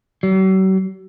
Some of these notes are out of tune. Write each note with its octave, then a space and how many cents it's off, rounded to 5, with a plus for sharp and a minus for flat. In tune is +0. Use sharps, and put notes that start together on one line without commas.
F#3 +45